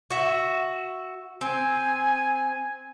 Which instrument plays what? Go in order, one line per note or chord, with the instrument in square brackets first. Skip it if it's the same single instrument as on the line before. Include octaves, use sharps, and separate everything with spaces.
[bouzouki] F#4 E5
[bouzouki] C4 [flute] G#5